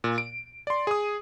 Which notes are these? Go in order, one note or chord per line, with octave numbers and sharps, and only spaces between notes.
A#2
D7
D5 C6
G#4 D#6